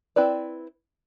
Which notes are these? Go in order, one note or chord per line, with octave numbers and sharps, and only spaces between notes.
C4 E4 B4 D5